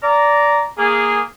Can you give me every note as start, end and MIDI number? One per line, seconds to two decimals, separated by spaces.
0.03 0.64 74
0.03 0.64 82
0.78 1.22 58
0.78 1.22 68